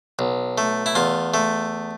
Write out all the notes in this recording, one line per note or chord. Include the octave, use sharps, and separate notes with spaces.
B1
A3
E4
E2 F4
A3